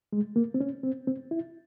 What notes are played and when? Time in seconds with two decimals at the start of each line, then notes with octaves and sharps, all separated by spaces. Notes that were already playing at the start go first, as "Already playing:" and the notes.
0.13 G#3
0.36 A#3
0.54 C4
0.61 C#4
0.84 C4
1.07 C4
1.31 E4